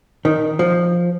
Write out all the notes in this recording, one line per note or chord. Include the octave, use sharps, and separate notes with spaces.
D#3
F3